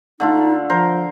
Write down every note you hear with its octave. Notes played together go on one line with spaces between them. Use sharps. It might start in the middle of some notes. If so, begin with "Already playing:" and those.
D3 A3 D#4 F4
F3 A#4 C5